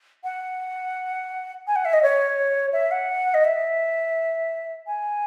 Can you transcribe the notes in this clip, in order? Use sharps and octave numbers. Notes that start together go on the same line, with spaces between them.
F#5
G#5
F#5
E5
D#5
C#5
E5
F#5
D#5
E5
G#5